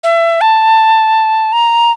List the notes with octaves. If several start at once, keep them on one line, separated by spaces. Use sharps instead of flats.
E5
A5
A#5